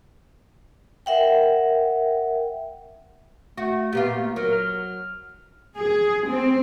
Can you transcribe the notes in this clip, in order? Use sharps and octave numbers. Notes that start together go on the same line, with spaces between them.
A#4 E5 F#5 G5
A3 F#4
A#2 B3 F4 G4
A3
F#3 A#4
F6
G#4
C4